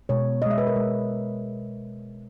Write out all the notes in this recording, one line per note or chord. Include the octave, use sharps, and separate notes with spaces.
B2 G#3 C#5
B2 G#3 D#5 E5
B4
A#4
B2 G#3